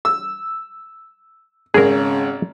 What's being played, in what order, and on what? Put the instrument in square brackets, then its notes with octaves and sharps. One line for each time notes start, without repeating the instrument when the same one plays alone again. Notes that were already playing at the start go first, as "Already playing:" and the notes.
[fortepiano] E6
[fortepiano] G#1 [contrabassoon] C#3 [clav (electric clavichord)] G#4 A#4